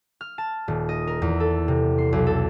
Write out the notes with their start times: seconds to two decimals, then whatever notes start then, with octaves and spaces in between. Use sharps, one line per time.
0.21 F6
0.38 A5
0.68 D#1
0.89 D#5
1.07 A#4
1.22 E2
1.40 A4
1.68 C3
1.98 C6
2.13 B1
2.27 A4